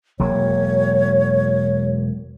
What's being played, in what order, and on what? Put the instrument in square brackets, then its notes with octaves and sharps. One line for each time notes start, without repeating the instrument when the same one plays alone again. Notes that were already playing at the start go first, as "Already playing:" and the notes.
[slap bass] E1 F#3 A#3 [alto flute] C#5